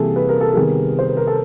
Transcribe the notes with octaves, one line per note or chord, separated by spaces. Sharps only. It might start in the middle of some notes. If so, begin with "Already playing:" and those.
Already playing: C3 E3 G3 A#3 G#4 A4
B4
A#4
A4
C3 D#3 G3 B3 G#4 A#4
C5
B4
A#4
A4